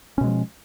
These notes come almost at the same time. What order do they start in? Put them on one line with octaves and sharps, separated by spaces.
C#4 B2 G#3 F3